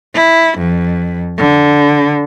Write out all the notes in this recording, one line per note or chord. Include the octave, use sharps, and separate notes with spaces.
E4
F2
D3